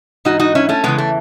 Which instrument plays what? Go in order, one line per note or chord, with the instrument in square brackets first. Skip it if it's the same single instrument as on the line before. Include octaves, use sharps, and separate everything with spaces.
[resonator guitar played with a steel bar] G#2 E3 D#4 F#4
D#4 F#4
C#4 E4
A3 C#4
E2 C#3 E3 G#3 B3
A3